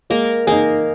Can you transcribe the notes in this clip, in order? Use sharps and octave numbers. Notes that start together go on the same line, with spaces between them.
G#3 A#3 A#4
A#3 D#4 G#4 A#4